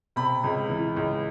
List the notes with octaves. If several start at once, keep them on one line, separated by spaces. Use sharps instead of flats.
C3 B5
C#2
E3
C#2